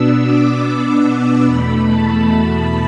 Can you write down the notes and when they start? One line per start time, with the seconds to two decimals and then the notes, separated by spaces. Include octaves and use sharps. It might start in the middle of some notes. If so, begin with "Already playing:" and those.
Already playing: B2 B3 D4 E6
0.23 D6
0.63 E6
1.44 E2 B2 A3 B5
1.85 A5